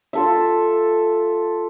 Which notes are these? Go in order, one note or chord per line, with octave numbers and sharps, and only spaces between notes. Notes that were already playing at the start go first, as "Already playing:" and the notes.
F4 A4 E5